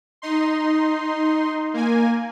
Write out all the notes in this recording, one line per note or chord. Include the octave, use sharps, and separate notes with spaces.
D#4 C6
A#3 G#5